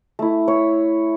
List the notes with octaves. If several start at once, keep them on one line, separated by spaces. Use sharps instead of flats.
A3 E4
C#5